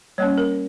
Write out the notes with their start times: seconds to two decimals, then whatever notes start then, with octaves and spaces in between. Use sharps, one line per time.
0.18 G3 A#3 C#4 C#5
0.38 A#4